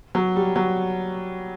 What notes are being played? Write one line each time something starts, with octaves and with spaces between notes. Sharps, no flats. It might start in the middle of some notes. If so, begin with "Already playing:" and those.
F#3
G3
F#3